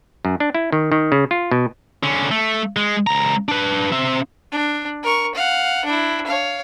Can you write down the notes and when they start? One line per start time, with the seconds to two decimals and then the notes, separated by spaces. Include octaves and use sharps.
0.25 F#2
0.40 D4
0.55 E4
0.72 D#3
0.92 D#3
1.12 C#3
1.31 F4
1.51 B2
2.03 D3 C#4
2.31 A3
2.76 G#3
3.07 C#2 A#5
3.49 D4 B4
3.92 C4 E5
4.52 D4
5.03 A#4 C#6
5.35 F5 F#5
5.85 D4 E4
6.26 C#5 F5